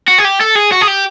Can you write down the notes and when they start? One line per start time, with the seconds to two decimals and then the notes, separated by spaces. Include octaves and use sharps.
0.08 F#4
0.19 G#4
0.25 G4
0.41 A4
0.55 G#4
0.72 F#4
0.81 G#4
0.87 G4